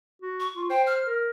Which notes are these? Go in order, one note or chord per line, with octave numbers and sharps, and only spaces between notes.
F#4
C#6
F4
C5 G5
F6
A#4